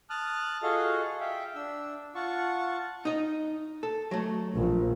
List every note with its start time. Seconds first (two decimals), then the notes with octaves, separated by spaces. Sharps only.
0.10 A5 D#6 F6 F#6
0.63 F4 F#4 G#4 A4 D#5 F5
1.21 E5 F5 G5
1.55 D4 E6
2.15 F4 F#5 A5 C#6
3.05 D#4 D#5
3.83 A4
4.11 F#3 A3
4.55 A#1